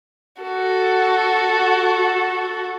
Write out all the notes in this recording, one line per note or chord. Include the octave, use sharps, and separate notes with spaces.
F#4 A4